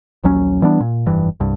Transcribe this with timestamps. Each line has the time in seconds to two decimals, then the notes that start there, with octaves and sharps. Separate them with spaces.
0.23 A#1 D#2 F#3 C#4
0.62 E3 G3 B3 D4
0.80 A#2
1.06 F1 G2 E3
1.40 C2 G2